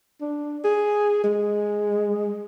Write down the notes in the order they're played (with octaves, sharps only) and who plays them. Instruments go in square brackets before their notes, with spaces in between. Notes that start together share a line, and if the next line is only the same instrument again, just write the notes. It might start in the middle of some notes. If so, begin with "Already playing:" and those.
[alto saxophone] D4
G#4
G#3